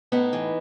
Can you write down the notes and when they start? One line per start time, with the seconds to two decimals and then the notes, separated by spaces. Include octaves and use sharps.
0.12 A2 B3 D#4
0.33 E3